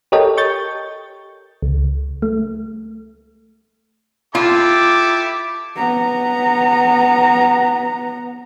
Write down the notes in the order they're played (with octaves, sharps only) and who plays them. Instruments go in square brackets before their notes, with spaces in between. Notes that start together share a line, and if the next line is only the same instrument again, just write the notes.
[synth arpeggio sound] G4 A4 A#4 C#5 D#5 G5
C#6 G6 A6
C#2
A3
[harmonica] E4 G4 A4 [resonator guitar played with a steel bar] F4 [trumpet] D6
[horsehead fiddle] B3 A#5